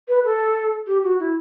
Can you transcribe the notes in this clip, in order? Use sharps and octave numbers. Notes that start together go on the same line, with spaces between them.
B4
A4
G4
F#4
E4